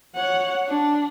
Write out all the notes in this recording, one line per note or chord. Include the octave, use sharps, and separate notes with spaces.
C#5 F#5
D4